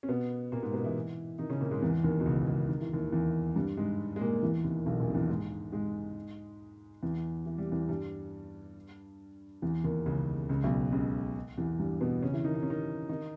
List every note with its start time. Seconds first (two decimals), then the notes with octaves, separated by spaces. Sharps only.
0.03 C#4
0.08 B2 B3
0.52 A#2 A#3
0.62 G#2 G#3
0.73 B2 B3
0.84 E3 E4
1.39 D#3 D#4
1.49 C#3 C#4
1.61 A#2 A#3
1.71 G#2 G#3
1.82 E2 E3
2.04 D#2 D#3
2.20 B2
2.26 C#2 C#3
2.47 C#2 C#3
2.69 D#3
2.81 E3
2.93 D#2 D#3
3.12 E2 E3
3.56 G2 G3
3.77 G#2 G#3
4.16 G#3
4.21 A#2 A#3
4.42 E2 E3
4.64 D#2 D#3
4.86 B1 B2
5.00 A#1 A#2
5.10 D#3
5.14 E2 E3
5.29 G#2 G#3
5.72 G#2 G#3
7.02 E2 E3
7.46 E3
7.58 G3
7.72 E2 E3
7.89 G2 G3
9.62 E2 E3
9.84 D#2 D#3
10.06 C#2 C#3
10.49 C#2 C#3
10.63 B1 B2
10.92 C#2 C#3
11.58 E2 E3
11.79 G2 G3
12.01 B2 B3
12.23 C#3 C#4
12.33 E3 E4
12.44 D#3 D#4
12.55 D#4
12.63 C#4
12.70 D#3 D#4
13.09 D#3 D#4